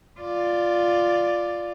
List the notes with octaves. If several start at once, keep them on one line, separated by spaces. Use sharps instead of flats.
F4 D5